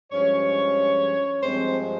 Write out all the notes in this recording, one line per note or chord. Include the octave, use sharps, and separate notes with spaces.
G2 F3 G#3 C#4 C#5
G2 F3 G#3 C4 C5